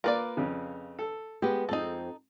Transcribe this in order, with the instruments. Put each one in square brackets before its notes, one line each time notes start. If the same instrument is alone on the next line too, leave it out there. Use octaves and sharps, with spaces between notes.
[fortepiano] A#3 A#4 [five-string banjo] F4 B4 D5
[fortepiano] F2 C#3
A4
[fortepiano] G#3 [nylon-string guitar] B3 G4
[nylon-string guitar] F2 C4 [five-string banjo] D#4 A4